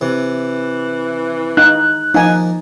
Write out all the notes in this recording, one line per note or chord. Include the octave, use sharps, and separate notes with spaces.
C3 E3
D#4 F#6
F3 A#3 D#4 G#5